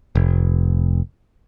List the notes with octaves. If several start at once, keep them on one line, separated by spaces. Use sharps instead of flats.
F1